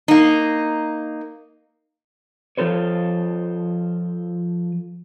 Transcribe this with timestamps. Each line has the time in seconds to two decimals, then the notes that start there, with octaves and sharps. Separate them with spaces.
0.08 A#3 D#4
2.58 F3 F4 A4 C5 C#5